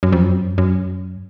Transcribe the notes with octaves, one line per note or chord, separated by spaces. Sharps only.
F#2
F2
F#2
F#2